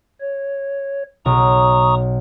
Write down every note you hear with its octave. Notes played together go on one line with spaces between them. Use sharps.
C#5
B1 A#5 C#6 D#6